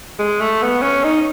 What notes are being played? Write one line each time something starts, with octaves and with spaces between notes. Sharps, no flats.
G#3
A3
B3
C#4
D#4